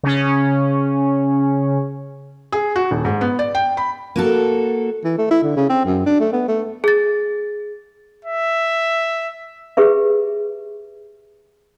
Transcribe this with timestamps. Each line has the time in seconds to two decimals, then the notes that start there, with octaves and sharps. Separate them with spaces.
0.03 C#3 C#4
2.52 G#4
2.76 F#4
2.91 D#1
3.05 G#2
3.21 B3
3.39 D5
3.55 G5
3.77 B5
4.16 A#3 F#4 A4
5.04 E3
5.18 A3
5.31 E4
5.43 D3
5.57 C#3
5.70 C4
5.85 F#2
6.06 D4
6.20 A3
6.32 B3
6.48 A3
6.84 G#4 A6
8.25 E5
9.77 G4 G#4 B4 E5